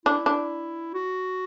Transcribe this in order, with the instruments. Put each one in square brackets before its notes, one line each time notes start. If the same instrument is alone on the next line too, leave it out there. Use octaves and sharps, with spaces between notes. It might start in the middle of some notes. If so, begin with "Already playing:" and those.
[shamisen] D4 [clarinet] E4
[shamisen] D4
[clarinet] F#4